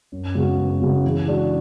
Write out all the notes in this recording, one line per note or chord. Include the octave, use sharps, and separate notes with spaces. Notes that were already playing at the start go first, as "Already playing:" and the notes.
F#2
C#3 G#3 B3 F#4
F#2
C#3 G#3 B3 F#4
E3
G#3 D4 F#4